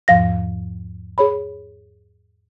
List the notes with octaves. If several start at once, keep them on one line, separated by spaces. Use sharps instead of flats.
E2 G#2 F3 F5 A#6
G#4 C#5 B5